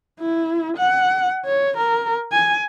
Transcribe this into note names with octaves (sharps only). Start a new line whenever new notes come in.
E4
F#5
C#5
A#4
G#5